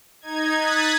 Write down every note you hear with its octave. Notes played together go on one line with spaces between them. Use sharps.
D#4 G#6
D#6 F#6 G#6 A6 B6